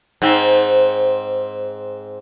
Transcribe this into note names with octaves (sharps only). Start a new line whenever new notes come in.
G#2 C4